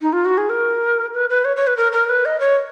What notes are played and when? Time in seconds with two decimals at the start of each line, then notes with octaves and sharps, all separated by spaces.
0.01 D#4
0.13 F4
0.25 F#4
0.38 G#4
0.49 A#4
1.14 B4
1.30 B4
1.45 C#5
1.56 C#5
1.67 B4
1.77 A#4
1.92 A#4
2.09 B4
2.25 D#5
2.40 C#5